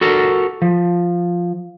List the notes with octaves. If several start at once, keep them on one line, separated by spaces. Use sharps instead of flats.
F#4 A4 A#4
F3